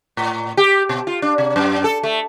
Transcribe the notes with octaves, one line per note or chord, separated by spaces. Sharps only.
A2
G4
B2
F4
D4
C3
F#2
A4
A3